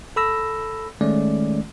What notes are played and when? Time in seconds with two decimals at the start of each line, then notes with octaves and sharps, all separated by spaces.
0.16 A4 B5 E6 A#6
1.01 D#3 G#3 A3 C#4 D5